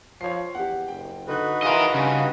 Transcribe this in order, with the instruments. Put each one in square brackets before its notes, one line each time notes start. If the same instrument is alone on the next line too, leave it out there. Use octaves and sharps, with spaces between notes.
[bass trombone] F3 [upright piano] C#5 C7
[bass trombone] E2 [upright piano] G4 F#5
[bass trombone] F#1 [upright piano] G5
[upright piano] D3 F#6 [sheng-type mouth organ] D#4 F#4 B4
[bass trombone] E3 [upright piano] G#4 F5 C6 [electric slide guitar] A#4 D#5
[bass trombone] G2 [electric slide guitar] C#3